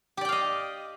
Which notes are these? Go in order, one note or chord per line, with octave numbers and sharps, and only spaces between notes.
G4 D5 D#5 F5 G5